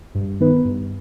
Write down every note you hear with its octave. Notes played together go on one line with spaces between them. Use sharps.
G2
D#3 B3 D#4 B4
G2